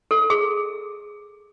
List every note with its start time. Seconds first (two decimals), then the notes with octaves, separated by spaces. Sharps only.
0.11 A4
0.30 G#4